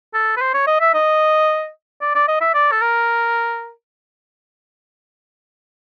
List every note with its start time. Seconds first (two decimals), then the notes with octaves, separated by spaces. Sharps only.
0.14 A4
0.37 B4
0.41 C5
0.54 C#5
0.67 D#5
0.81 E5
0.94 D#5
2.01 D5
2.15 D5
2.28 D#5
2.41 E5
2.54 D5
2.72 A4
2.82 A#4